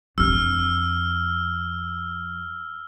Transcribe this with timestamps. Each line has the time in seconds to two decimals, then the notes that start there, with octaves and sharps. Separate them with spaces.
0.18 F2 D4 E6 F6